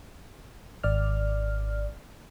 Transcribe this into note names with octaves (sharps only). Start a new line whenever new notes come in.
G#1 D5 F6